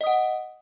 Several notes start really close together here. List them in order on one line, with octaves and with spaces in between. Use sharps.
D#5 D#6 F#5